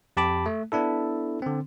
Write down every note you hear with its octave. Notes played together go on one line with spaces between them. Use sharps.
F2 G4 A5 B5 D6
A3
B3 D4 E4 A4
D3 C4